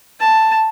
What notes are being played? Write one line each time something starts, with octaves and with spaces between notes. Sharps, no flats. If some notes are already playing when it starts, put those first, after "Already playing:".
A5